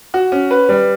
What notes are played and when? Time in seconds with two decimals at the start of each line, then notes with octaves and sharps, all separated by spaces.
0.14 F#4
0.32 C#4
0.51 B4
0.69 G3